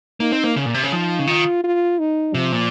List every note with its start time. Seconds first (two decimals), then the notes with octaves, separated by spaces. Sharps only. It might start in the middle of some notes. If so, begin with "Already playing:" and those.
0.20 A#3 D#4
0.32 C4
0.44 A#3
0.56 C#3
0.66 A#2
0.74 C3
0.84 C#3
0.92 F3 D#4
1.19 C#3
1.27 D#3 F4
1.64 F4
1.99 D#4
2.35 C3 F3
2.52 A#2